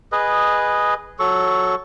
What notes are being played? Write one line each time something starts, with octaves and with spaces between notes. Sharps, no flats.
G#4 B4 D#5
F#3 A4 C#6